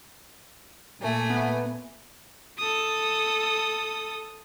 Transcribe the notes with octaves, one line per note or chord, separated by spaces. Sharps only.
A#2 A3 G#5
B3
A4 D#6